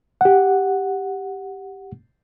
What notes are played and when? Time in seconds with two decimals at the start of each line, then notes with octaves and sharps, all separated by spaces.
0.21 G4 F#5